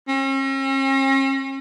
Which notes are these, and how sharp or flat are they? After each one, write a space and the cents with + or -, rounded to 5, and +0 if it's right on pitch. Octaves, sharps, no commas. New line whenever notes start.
C#4 -45